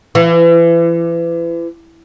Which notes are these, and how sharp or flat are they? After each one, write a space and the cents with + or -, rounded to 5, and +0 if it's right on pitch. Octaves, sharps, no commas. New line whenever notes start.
E3 +35